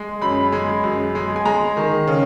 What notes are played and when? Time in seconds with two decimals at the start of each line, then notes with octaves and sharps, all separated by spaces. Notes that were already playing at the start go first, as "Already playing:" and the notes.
Already playing: G#3
0.22 F#2 B5
0.52 G#3
0.84 F#2
1.15 G#3
1.36 G#5
1.45 G#3 A#5
1.77 D#3
2.07 C#3